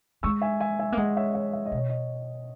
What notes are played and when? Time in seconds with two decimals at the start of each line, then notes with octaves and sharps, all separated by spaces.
0.23 G#3 C#6 E6
0.42 E5 G#5
0.60 E5 G#5
0.80 E5 G#5
0.92 A#3
0.97 G#3 D#5 F#5
1.17 C#5 E5
1.35 C#5 E5
1.53 E5
1.66 D#5
1.72 B2
1.77 C#5
1.89 D#5